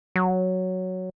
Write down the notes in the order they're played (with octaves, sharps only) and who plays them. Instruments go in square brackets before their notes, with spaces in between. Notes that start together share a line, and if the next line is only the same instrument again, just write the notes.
[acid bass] F#3